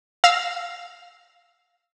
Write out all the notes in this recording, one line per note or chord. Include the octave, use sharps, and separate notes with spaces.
F5 E6 A#6